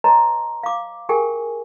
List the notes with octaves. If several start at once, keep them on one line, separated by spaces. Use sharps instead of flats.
B4 C#5 D#5 A5 A#5 C6
F5 D6
G4 G#4 A#4 G5 G#5